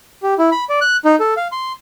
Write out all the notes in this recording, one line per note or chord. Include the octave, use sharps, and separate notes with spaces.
G4
E4
B5
D5
F#6
D#4
A4
F5
C6